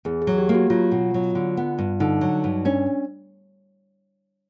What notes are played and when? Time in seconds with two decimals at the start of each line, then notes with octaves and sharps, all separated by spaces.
0.05 E2 G#4
0.22 G#4
0.27 F#3
0.38 G4
0.49 A#3 G4
0.54 F#4
0.70 F#3 F4
0.91 B2
1.14 F#3
1.35 D3
1.57 B3
1.78 G2
2.00 D3 D#4
2.21 F#3
2.44 G2
2.65 C#4 D4